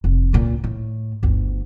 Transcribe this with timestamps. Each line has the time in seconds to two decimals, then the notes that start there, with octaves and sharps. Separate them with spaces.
0.04 F1
0.33 C#2 A#2
0.64 A2
1.23 G1 D2